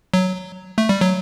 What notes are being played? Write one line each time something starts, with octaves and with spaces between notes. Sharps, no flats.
F#3
A3
G3
F#3